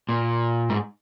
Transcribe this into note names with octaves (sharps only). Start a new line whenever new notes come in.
A#2
G#2